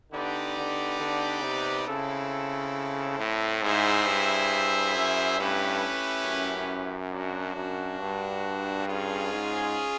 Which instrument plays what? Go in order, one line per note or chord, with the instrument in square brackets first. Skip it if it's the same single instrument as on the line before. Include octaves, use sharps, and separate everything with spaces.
[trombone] D3 [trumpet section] B3 D#4 G4 B4 D5
[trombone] D3
D3
C3
[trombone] C#3 [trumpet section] C4 E4 A4
[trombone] A2
[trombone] G#2 [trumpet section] E4 G#4 C5 E5
[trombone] G2
F#2
[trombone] G2 [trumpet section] A3 C#4 E4 G4 B4
[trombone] F#2
[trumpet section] A#3 D4 F#4
[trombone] F#2
G2
[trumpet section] C#4 F4 G#4
[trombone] G#2